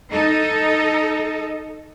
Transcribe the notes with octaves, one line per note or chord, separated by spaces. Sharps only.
D#4 A4 D#5